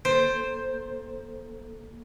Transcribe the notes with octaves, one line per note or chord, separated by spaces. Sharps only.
A#3 A4 C5